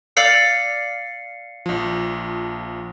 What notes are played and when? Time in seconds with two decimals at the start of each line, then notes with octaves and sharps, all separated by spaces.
0.17 D5 F5 E6 C7 C#7
1.66 A#1 F3